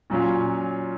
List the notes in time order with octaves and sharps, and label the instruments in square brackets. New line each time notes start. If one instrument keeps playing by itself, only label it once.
[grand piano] A#2 F#3 C#4 F4